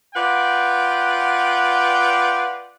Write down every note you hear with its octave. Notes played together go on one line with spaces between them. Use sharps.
F4 B4 D5 F#5 G5